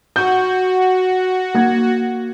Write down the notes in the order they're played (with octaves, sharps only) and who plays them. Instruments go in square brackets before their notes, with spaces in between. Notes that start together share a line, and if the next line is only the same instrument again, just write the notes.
[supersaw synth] F#4 [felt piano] G6
[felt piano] A#3 G#6